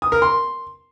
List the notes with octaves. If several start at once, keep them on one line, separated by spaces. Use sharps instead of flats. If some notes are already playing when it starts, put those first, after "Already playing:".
D#6
A#4
C6